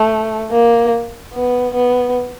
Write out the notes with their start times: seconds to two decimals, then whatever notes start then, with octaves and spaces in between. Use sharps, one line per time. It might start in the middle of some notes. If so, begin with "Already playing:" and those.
Already playing: A3
0.51 A#3
1.34 B3
1.75 B3